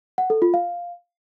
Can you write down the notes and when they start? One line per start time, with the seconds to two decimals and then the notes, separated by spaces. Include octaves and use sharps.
0.18 F#5
0.30 A4
0.42 F4
0.54 F5